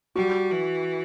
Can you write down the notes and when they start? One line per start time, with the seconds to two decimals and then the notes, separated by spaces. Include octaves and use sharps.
0.15 G3 F#4
0.51 E3